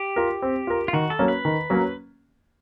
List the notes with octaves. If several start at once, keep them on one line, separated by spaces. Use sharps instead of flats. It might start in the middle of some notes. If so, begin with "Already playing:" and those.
Already playing: G4
F4 A#4
C4
F4 A#4
F4
D#3 F#4
A4
F#3 A#3 C#4
B4
D#3
F#3 A#3 C#4